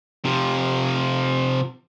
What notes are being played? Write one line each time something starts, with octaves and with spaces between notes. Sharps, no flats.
C3 F3